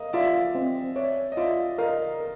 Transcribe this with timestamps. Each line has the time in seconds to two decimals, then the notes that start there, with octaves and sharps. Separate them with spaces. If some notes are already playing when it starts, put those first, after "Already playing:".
Already playing: A#4 D#5 F5
0.13 F4 D5 E5
0.55 C4
0.96 C#5 D5 E5
1.32 D#5
1.37 F4 D5 E5
1.78 A#4 D#5 F5
2.20 A#4